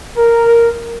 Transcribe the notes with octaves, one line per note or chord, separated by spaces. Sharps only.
A#4